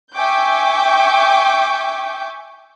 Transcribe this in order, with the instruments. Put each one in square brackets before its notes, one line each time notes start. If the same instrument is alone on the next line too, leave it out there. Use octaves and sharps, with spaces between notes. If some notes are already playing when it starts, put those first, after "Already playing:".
[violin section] E5 G5 G#5 C#6 D6 G6